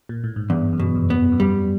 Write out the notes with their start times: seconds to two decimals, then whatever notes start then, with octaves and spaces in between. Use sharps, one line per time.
0.09 A#2
0.24 A2
0.36 G#2
0.50 E2 G2
0.73 F#2
0.80 B2
0.95 F2
1.10 B3
1.32 F#2
1.40 F2 G3